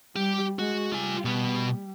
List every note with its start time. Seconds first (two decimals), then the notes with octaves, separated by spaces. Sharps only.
0.16 G3 G4
0.59 G#3 F#4
0.92 G3 F4 G#5
1.25 B2 B3